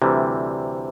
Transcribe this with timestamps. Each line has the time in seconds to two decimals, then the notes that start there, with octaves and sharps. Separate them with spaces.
0.02 D2 C3 E3 G3